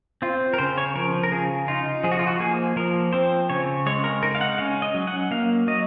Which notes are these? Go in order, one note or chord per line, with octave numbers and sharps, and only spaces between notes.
C4 F4
A#4
C#3 C5
C#5
F3 A#4
A#4
C#3 G#4
D#4 F4
F3 G#4
F#4
F4
F#4
A#3 G#4
F3 A#4
C4 C5
C#3 C#5
G#3 C#5
A#4
D#4 A#4
F5
F#5
C#4 F5
D#5
F#3
F#5
A#3 F5
F#3 D#5